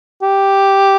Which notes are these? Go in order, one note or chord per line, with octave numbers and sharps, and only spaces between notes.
G4